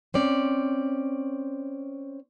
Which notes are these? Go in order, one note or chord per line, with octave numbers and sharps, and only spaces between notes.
C4 C#4 D5